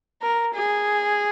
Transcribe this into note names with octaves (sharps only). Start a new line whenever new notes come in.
A#4
G#4